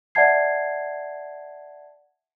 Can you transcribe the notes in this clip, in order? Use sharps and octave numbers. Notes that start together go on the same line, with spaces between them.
D5 E5 F#5 A5 G#6 C7